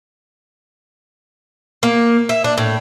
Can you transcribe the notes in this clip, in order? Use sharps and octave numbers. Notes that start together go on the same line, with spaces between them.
A#3
E5
D4
A2